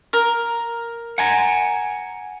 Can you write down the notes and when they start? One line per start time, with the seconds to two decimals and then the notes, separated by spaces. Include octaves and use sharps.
0.13 A#4
1.18 F#5 G#5 A#5